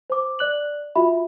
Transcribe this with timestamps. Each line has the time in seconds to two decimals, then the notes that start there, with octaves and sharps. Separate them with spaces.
0.10 C5 D6
0.39 D5 F#6 F#7
0.95 F4 F#4 E5 B5